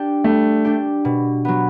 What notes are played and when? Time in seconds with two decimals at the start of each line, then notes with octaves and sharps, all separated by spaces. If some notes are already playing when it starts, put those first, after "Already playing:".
Already playing: D4 G4
0.24 G3 A3
0.65 D4 G4
1.05 B2
1.45 F#3 B3